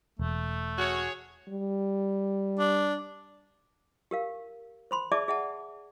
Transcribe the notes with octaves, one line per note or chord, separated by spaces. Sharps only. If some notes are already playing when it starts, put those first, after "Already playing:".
E1 A3
F#4 G#4 C#5
G3
D4
G4 A#4 F5
C5 B5 C6
G#4 D5 E5 A5 D6
G#4 E5 F#5 A5